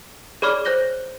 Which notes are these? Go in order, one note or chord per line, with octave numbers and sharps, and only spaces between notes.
G#4 C#5 D5 B5 D6 F6
C5 F#6 G6 A#6 G7